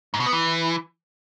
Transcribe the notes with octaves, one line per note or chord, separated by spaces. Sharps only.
G#2
B2
B3
E3